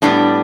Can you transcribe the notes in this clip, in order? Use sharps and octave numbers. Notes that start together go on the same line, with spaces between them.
A2 G3 B3 D4